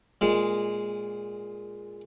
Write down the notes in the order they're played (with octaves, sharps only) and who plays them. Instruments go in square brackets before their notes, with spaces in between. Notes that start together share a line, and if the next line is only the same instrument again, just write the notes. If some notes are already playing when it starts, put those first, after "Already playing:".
[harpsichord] A#2 G#3